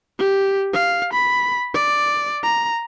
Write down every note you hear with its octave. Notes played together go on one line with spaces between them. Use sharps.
G4
F5
B5
D5
A#5